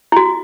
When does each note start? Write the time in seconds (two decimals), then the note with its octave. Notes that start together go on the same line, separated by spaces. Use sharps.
0.12 E4
0.16 F#4